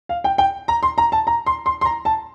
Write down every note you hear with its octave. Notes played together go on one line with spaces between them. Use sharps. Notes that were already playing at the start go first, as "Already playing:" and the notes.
F5
G5
G5
A#5
C6
A#5
A5
A#5
C6
C6
C6
A#5
A5